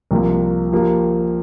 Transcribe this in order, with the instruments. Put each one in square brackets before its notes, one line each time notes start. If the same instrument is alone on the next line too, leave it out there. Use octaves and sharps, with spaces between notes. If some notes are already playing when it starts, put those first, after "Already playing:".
[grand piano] C2 C3 F3 A#3
F3 A#3 G4